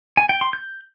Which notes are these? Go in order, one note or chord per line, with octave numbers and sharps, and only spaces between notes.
G#5
G5
C6
G6